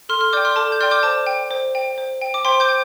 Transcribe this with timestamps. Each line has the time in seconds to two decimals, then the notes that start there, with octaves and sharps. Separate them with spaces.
0.09 A4 C6 F6
0.21 C6 F6
0.33 D5 G5 D6 G6
0.45 C6 F6
0.56 A4 A5 D6
0.72 G6
0.81 D5 G5 C6 F6
0.91 D6 G6
1.03 C5 A5 D6
1.27 G5
1.51 C5
1.75 G5
1.98 C5
2.21 G5
2.34 D6
2.45 C5 G5 C6
2.60 D6 G6
2.69 G5